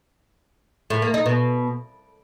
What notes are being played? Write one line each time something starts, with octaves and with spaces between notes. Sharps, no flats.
A2
A#3
D#4
B2